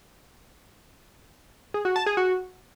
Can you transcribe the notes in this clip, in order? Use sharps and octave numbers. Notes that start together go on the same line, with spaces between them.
G#4
F#4
A5
G#4
F#4